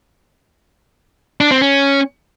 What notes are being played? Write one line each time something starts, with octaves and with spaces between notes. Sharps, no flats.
D4
C4
C#4